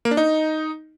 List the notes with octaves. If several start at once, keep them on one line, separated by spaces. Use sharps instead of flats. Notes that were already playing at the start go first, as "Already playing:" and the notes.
A#3
D4
D#4